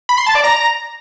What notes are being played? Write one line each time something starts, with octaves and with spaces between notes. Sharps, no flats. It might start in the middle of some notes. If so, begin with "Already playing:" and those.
B5
C6
A5
D5
A#5